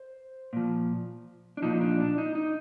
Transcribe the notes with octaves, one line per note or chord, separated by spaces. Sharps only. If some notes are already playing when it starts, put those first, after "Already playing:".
Already playing: C5
A#2 F3
D4
A#2 F3 D#4
D4
D4
D#4
D#4